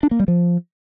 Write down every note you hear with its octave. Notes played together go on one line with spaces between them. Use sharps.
D4
A#3
G3
F3